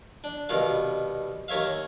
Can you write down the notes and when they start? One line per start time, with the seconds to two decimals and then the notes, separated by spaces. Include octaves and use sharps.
0.24 D4
0.49 C2 B2 D#3 F5
1.48 D#2 A#4 C#5 E5 F5